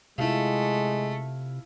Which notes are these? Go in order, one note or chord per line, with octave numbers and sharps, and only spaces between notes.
C3 G#3 A3 E4 F4